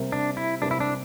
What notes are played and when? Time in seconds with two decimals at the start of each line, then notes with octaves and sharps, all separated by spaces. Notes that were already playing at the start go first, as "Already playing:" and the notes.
Already playing: C3 G3 A#3
0.12 D4
0.37 E4
0.62 C3 G3 A#3 D4
0.71 E4
0.80 D4